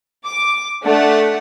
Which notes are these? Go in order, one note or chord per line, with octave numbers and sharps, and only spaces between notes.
D6
A3 D4 F#5